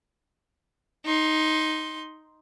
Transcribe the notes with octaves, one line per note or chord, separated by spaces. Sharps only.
D#4 C6